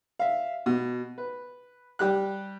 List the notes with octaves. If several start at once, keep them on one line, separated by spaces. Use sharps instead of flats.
E5 F5
B2
B4
G3 G4 F#6